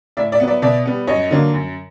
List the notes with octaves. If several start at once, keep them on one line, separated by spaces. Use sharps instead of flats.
A2 D5 E5
D5 E5
F#3 B3
D5 E5
B2 D5 E5
G3 B3
F#2 C#5 D#5
D3 F#3 A#3
F#2